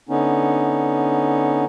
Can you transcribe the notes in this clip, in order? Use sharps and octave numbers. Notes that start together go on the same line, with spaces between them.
D3 B3 C#4 D#4